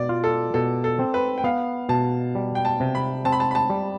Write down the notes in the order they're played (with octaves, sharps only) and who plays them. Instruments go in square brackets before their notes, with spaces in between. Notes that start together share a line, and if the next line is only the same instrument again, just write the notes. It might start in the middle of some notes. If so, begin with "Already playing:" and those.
Already playing: [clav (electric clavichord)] B2 [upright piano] D5
[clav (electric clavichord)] F4
[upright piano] A4
[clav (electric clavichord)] B2 [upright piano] A4
[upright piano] A4
[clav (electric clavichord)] C4
[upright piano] B4
G5
[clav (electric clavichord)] B3 [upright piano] F5
[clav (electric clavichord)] B2 [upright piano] A5
[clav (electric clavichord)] G3
[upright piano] G5
A5
[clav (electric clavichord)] C3
[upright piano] B5
[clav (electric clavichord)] C4 [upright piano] A5
[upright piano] B5
A5
B5
A5
[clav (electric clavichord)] G3